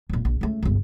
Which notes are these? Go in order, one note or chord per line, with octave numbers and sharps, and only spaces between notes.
D1 A#2
A#1
C#2 A3
G1 C#2